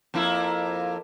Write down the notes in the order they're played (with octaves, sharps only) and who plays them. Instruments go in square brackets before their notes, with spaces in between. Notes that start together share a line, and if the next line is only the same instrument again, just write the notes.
[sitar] F2 A#3 E4